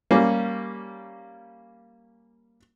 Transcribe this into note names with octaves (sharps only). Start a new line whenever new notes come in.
G3 A#3 C#4